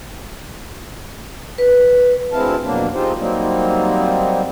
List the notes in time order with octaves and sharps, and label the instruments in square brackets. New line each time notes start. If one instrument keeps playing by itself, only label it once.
[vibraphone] B4
[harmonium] D2 G#3 C4 E4 F5 A5
F2 B2 F#3 A#3 D4
G#3 C4 D#4 F4 G4 C5
F#3 G3 A#3 C4 D#4